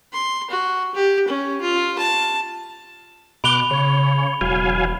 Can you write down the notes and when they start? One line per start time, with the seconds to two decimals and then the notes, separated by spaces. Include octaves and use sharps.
0.13 C6
0.50 F#4
0.94 G4
1.28 C#4
1.61 F4
1.98 A5
3.44 B2 B5 D6 F#6 F7 G7
3.71 C#3 C#5
4.41 E1 F#3 F5 G#5